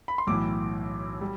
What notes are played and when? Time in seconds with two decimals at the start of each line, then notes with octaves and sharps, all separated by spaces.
0.08 B5
0.18 C6
0.27 B1 A2 E3 D6
1.21 G3